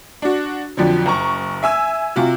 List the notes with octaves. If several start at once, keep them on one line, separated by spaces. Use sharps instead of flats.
D4 F#4
F2 D3 F3 F#3
F#1 A#5 C#6
E5 G#5 E6
C3 F4 F#4